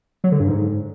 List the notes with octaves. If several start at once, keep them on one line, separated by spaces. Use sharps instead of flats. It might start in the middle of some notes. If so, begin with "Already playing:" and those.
F#3
D3
G2
G#2